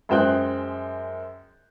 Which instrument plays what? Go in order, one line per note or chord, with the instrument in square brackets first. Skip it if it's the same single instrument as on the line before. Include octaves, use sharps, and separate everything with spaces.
[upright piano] F#2 G#3 C5 G5 F#6